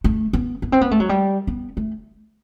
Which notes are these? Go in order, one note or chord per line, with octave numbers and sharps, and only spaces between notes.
A3
B3
B3
C4
B3
A3
F#3
G3
B3
A3